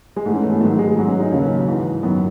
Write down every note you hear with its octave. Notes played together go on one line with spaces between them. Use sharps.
G#3
G#2 E3 A3
C#4
A3
B3
G#2 D#3 F#3 A3
G#3
G#2 F#3 B3
C#4
D#4
D#2 C#3 F#3 C#4
G#2 E3
F#2 D#3 F#3 B3